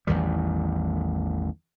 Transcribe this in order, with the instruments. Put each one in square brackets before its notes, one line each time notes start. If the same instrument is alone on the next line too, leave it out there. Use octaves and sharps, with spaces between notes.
[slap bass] A1 E2 D#3 G3